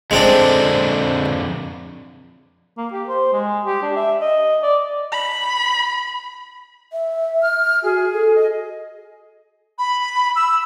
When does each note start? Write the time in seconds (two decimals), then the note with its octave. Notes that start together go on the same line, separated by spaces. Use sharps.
0.11 F2 D3 G#3 C4 D4 G5
2.77 A#3
2.92 G4
3.08 C5
3.33 G#3
3.65 G4
3.82 D4
3.96 E5
4.21 D#5
4.63 D5
5.12 B5
6.93 E5
7.41 F6
7.83 F#4 G#4
8.13 A4
8.36 D#5
9.79 B5
10.36 E6